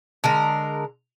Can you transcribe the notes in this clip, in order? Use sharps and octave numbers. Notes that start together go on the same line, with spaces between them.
D3 G#3 A#4